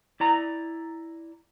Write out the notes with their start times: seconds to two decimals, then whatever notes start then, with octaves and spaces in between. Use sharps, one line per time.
0.20 E4 D5 A#5